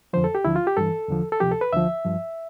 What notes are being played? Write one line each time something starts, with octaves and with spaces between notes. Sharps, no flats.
F2 D3 F3 C5
A4
G4
D2 D3 F3 E4
F4
G4
G2 E3 A4
E2 D3 F3
A4
D2 C3 F3 G4
A4
B4
D2 D3 F3 E5
G2 F3